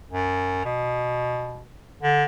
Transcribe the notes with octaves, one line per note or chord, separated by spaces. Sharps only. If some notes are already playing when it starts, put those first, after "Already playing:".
F#2
B2
D3